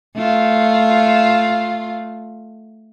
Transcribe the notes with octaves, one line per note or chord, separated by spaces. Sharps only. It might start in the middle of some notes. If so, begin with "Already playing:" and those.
A3 F4